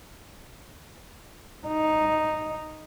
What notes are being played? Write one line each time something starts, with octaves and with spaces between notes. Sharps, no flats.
D#4